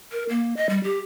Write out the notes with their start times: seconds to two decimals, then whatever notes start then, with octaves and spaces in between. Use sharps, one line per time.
0.12 A#4
0.29 A#3
0.57 D#5
0.69 G3
0.84 G4